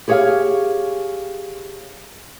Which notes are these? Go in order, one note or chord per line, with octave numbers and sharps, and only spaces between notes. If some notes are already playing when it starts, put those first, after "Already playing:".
G4 G#4 C#5 E5 F5